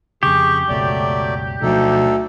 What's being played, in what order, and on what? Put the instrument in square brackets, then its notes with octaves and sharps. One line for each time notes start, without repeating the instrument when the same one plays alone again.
[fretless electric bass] F2 C#3 [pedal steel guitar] G4 [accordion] G#4 C#6
[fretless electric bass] F#1 C#2 B2 [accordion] F#3 A3 D5
[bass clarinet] D2 [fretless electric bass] B2 F3 F#3 [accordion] D4 D#4 A4